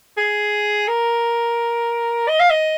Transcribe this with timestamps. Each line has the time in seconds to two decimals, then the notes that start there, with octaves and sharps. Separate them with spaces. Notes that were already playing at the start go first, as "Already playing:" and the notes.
0.18 G#4
0.88 A#4
2.28 D#5
2.40 F5
2.50 D#5